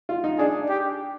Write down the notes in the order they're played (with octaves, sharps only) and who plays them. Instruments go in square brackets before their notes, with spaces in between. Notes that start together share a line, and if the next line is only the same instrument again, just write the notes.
[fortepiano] F4
D#4
[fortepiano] D4 [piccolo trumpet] G#4
[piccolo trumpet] G4